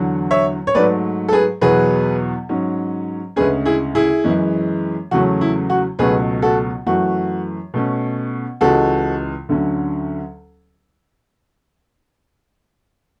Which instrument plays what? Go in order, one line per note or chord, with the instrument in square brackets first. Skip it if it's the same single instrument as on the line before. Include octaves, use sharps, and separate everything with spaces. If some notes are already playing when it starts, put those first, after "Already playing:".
Already playing: [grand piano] E2 D3 F#3
C#5 E5
C#5
G#2 F#3 A3 B4 D5
A4
G#4 B4
E2 B2 F#3 G#4 B4
G#2 F#3 C#4
D2 C#3 G#3 C#4 G#4 B4
E4 G#4
E4 G#4
F#2 E3 G#3 C#4
E2 C#3 F#3 A3 C#4 F#4
E4
F#4
C#2 B2 F#3 A3 C#4 G#4 B4
F#4 A4
F#2 E3 A3 F#4
B2 A3 C#4
C#2 C#3 E3 G#3 F#4 A4
D2 D3 F#3 C#4